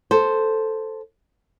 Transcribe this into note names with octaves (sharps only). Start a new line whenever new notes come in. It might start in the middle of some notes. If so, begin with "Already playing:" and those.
A4 C5